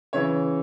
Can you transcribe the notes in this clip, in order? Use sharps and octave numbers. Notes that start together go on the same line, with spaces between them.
C#3 E3 C#5